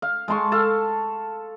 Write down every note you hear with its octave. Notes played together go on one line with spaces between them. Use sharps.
F5
G#3 A5 C6 C#6
A4 F5 A5